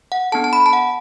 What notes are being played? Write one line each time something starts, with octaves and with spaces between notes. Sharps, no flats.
F#5
B3 D4 A4 A5
A5
B5
A5
F#5